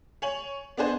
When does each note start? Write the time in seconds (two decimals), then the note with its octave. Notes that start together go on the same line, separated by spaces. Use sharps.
0.22 C#5 G#5 F#7
0.77 B3 D4 G#4 C5